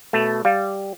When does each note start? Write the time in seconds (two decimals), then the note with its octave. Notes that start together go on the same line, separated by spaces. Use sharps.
0.13 B2 A3
0.45 G3 F5